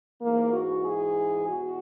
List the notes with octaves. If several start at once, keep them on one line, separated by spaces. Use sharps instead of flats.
G#2 E3 A#3
F#4
G#4
E2 B2 F#4